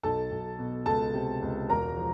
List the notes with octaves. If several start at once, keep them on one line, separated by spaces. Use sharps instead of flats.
B1 A4 A5
B1
B2
C#2 A4 A5
C3
C#2
E1 A#4 A#5
F3